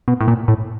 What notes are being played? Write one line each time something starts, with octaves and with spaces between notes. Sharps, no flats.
B2
A2
A#2
A2